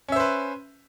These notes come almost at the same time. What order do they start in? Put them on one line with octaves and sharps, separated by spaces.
C#4 E5 C5 B4